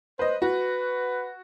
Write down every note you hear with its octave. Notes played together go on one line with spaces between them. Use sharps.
B4 C5 D#5
F#4 B4